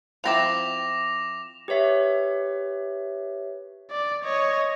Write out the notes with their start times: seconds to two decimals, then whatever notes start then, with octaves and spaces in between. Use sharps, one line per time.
0.24 F3 C4 E4 D6 A#6 F7
1.68 G4 B4 C#5 E5
3.90 D5
4.24 C#5 D#5